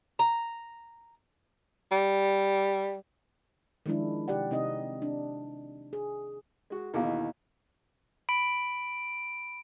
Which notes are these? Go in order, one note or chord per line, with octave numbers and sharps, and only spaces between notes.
A#5
G3
D#3 F3 G#3 D4 E4
C3 G4 D5 F#5
C3 C4 D#4 D#5
D4
G#4
G#3 F#4
D#2 B2 E3 E4 G#4 F5
B5 D7